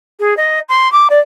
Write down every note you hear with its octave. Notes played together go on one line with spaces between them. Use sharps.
G#4
D#5
C6
D6
D5